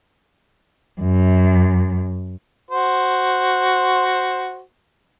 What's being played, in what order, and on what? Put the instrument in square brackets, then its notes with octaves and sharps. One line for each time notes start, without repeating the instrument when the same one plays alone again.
[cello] F#2
[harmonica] F#4 C5